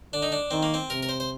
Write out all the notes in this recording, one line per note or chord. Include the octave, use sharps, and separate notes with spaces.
D3 D4
D#4
D4
D#3 C4
A#3
C4
C3 A#4
A#4
C5
C5